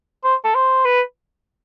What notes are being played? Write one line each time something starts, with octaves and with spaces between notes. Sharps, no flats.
C5
A4
C5
B4